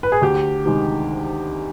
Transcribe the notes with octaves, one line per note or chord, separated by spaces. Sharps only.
B4
G#4
D2 G4
C3 D#3 G#3